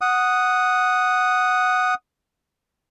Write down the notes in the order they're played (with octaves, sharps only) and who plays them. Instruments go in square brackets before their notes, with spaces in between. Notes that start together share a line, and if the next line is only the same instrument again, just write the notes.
[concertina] F#5 D#6